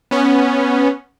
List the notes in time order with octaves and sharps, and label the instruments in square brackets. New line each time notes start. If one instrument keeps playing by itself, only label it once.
[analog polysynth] B3 C#4